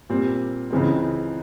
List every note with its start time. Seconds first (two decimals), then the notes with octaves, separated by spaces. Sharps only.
0.09 A#2 G3 C4
0.71 C#2 C#3 E3 G#3 C4